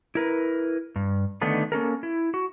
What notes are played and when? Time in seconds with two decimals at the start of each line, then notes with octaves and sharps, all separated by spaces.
0.15 E4 A#4 B4
0.96 G2
1.41 D3 D#3 A3 B3 D4 D#4
1.72 A#3 C#4 A4 A#4
2.03 E4
2.34 F#4